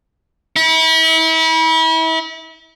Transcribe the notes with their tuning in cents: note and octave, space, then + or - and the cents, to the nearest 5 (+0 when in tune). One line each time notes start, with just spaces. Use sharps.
E4 -35